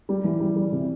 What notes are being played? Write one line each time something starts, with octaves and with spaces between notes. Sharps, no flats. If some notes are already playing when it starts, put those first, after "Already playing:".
G3
E3
G3
G3
C3